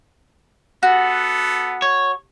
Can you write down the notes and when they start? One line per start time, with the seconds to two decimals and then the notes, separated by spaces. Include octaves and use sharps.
0.83 B3 F#4 A4
1.82 C#5